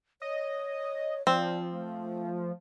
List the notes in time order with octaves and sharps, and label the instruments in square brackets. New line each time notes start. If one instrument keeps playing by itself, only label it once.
[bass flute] C#5 [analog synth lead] D#5
[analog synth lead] F3 [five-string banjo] C4 [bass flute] D5
[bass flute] A3